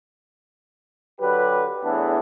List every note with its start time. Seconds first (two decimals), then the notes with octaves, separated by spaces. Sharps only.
1.21 D3 F#3 G4 B4
1.84 E2 A2 E3 B3 D4